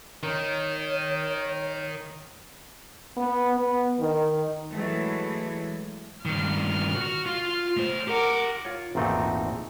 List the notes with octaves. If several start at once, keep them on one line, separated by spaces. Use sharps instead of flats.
D#3 C#5
B3
B3
D#3
E3 F#3 G#3 A3 E4
G2 D#3 F6
F#4
F4
A3 C5
G4 A#4 F#5 D6
F4 C#5
G#1 E2 A#2 A3 C4 D#4